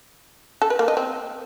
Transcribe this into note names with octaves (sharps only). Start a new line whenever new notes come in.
A4
B4
A#3
D#5
C4